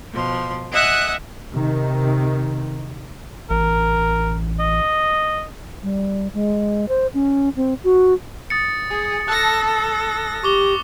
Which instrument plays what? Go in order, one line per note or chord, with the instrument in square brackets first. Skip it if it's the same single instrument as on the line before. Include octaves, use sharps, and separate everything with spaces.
[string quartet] B2 F3 C6
D#5 E5 F#5 G#5 D#6 F#6
[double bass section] C3 D#3
[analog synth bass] A1 [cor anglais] A#4
[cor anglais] D#5
[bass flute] G3
G#3
C5
C#4
C4
F#4
[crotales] D#6 A6 C#7
[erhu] G#4
[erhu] A4 [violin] A5 A#6 [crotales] F#6
[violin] A#6
[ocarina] G4 [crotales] C#6 D6 G7